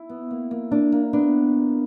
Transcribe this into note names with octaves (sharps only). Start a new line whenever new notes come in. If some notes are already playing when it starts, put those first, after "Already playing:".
Already playing: E4
B3
A#3
A#3
A#3 D4
A#3
B3 D4